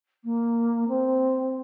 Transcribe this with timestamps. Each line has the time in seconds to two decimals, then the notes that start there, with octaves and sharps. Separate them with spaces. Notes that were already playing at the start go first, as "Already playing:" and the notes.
0.24 A#3
0.88 C4